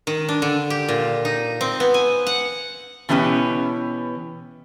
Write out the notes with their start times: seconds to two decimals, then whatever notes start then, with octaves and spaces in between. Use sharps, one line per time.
0.07 D#3
0.29 D4
0.42 D3
0.70 G4
0.88 A#2
1.25 D#4
1.61 C4
1.80 B3
1.94 G#5
2.27 F#5
3.09 B2 E3 B3 C#4 G4